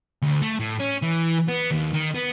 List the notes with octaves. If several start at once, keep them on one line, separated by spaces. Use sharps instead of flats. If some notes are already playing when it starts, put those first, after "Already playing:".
D2
A3
A2
C#4
E3
B3
D#2
D#3
B3